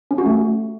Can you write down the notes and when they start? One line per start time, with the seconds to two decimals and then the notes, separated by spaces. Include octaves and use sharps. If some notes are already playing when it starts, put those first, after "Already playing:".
0.11 C#4
0.18 F#4
0.26 A3